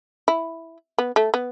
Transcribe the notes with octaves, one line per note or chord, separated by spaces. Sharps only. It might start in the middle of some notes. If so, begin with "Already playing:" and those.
E4
B3
A3
B3